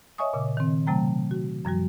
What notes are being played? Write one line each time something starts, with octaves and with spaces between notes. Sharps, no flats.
C#5 D#5 E5 G#5 C#6 D#6
A#2 C#3 D6
D#3 C4
C3 F#3 A3 G5 A#5
F#4
F#2 F3 G3 F#4